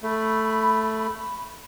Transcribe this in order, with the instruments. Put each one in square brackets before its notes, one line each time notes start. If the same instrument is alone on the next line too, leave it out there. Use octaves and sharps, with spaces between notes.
[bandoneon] A3 [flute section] B5